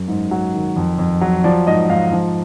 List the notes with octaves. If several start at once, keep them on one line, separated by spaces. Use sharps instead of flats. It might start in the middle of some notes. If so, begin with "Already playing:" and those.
Already playing: F#2
G#2
F#3
D#3
F2
F2
F#3
F3 D5
G#2 D#5
G#2 F5
F3